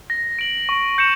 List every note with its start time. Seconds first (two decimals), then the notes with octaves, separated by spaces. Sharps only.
0.10 A#6
0.39 D7 F#7
0.69 C#6
0.98 G6 C#7 E7